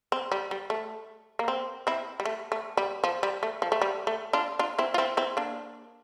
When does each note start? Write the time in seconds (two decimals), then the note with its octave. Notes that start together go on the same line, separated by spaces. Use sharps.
0.12 C4
0.32 G3
0.51 G3
0.70 A3
1.39 A#3
1.48 C4
1.87 C4 E4
2.20 G3
2.25 A3
2.52 A3
2.77 G3
3.04 F3
3.23 G3
3.43 A3
3.62 F3
3.72 A3
3.82 G3
4.07 A3
4.33 D4 F4
4.59 D4 F4
4.79 C4 E4
4.94 F4
4.98 C4 E4
5.17 C4 E4
5.37 A#3 D4